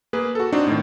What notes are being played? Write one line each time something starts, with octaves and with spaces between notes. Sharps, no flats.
A#3 G#4 B4
F#4 A4
C4 D4 D#4 F#4
A2 D#3